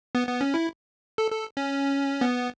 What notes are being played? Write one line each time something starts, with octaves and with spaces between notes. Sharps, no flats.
B3
B3
C#4
E4
A4
A4
C#4
B3